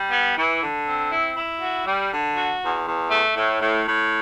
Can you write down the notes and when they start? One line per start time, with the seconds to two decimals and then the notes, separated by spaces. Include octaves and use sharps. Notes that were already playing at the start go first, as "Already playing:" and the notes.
Already playing: G3
0.12 B3
0.37 E3
0.62 D3
0.86 C4
1.11 E4
1.37 E4
1.61 F#4
1.86 G3
2.11 D3
2.36 F#4
2.62 E2
2.86 E2
3.11 A3
3.36 A2
3.61 A2
3.86 A2